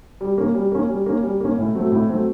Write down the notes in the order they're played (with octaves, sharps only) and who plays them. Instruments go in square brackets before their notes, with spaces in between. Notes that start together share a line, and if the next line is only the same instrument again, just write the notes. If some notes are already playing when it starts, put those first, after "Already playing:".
[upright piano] G3
A#3 C#4
G3
A#3 C#4
G3
A#3 C#4
G3
A#3 C#4
A2
F#3 A3 C4
A2
F#3 A3 C4